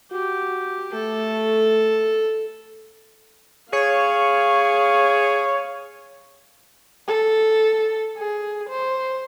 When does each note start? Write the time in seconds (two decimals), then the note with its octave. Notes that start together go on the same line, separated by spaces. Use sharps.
0.12 F#4 G4
0.94 A3 A4
3.73 G#4 C#5 F5
7.08 A4
8.18 G#4
8.69 C5